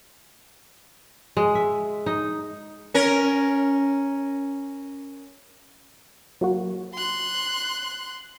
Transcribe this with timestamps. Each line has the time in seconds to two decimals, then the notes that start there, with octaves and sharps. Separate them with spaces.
1.37 G#3
1.55 E5
2.06 D#4
2.94 C#4 A#4
6.41 F#3 A#3 F#4
6.95 C6 F#6